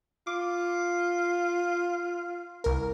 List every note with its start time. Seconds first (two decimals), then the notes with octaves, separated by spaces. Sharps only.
0.27 F4 D6
2.64 C2 A#4